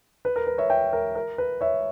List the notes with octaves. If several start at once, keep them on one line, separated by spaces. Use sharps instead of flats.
B4
A#4
B4
C#5 E5
E5 G5
A#4
A#4
B4
C#5 E5